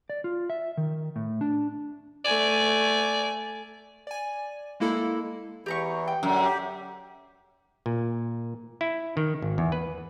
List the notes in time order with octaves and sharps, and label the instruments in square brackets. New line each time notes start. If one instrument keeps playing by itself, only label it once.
[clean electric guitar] D5
F4
E5
D#3
A2
D4
[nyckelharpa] A3 G#5 [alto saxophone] D5
[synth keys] D5 G#5
G#3 A#3 E4 A4
[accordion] E2 E3 [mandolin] G4 A#5 C#6
[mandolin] G5
[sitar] F#2 [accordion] D3
[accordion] G4
[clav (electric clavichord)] A#2
E4
D#3
G#1
E2
B4